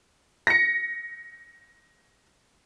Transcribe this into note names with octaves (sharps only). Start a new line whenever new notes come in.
A#6 C#7